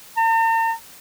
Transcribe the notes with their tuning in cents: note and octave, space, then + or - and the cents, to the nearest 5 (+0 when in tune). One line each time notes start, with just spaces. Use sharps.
A#5 -45